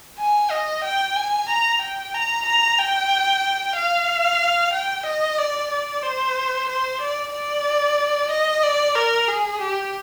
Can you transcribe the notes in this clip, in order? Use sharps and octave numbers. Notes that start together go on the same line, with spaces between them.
G#5
D#5
G5
G#5
A#5
G5
A#5
A#5
G5
F5
G5
D#5
D5
D5
C5
C5
D5
D5
D#5
D5
A#4
G#4
G4